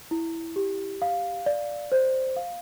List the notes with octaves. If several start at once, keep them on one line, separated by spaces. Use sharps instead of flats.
E4
G4
F5
D5
C5
F5